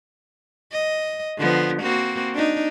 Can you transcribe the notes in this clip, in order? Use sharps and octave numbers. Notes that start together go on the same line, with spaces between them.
D#5
D3 F3 B3
A#3 C4 F#4
D4 D#4